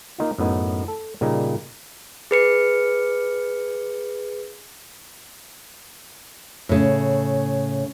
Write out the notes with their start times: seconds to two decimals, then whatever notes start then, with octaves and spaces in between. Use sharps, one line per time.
0.18 A#3 D#4 F4
0.38 F#2 A2 B3 D#4
0.88 A4
1.21 A#2 C#3 G3 D#4 A#5
2.31 G#4 B4 C#7
6.69 A2 C#3